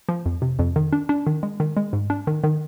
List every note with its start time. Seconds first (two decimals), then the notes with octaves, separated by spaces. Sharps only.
0.09 F3
0.26 F2
0.42 C3
0.59 F2
0.76 D#3
0.93 D4
1.09 D4
1.27 D#3
1.43 G#3
1.60 D#3
1.77 G#3
1.93 G#2
2.10 D4
2.27 D#3
2.44 D#3